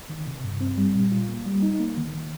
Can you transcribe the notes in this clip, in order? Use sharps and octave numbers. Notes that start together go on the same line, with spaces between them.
D#3
C3
G2
C4
G3
A#2
F4
A#3
G3
D#4
A#3
D#3
D#3